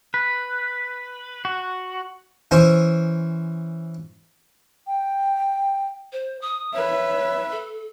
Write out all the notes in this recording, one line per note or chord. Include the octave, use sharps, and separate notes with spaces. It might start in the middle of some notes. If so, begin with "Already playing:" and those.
B4
F#4
E3 C#4 C5
G5
C5
D#6
B4 C#5 E5
A4